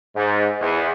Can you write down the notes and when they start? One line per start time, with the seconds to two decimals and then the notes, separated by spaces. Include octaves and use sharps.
0.16 G#2
0.61 E2